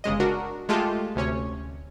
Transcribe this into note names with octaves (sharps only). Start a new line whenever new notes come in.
G1 C#3 G#3 D#5
D4 F#4 A#4
G#3 A3 F4 G4 A4
D2 C3 C#4 C#5